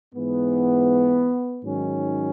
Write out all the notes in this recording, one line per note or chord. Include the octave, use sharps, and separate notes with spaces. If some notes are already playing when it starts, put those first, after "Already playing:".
G#2 E3 B3
G#2 D#3 F#3 C#4